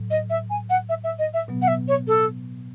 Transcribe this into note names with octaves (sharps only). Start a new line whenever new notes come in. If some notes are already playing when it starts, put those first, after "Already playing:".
Already playing: A2 F#3
D#5
E5
G#5
F#5
E5
E5
D#5
E5
B2 F#3 B3
F#5
E5
C#5
A4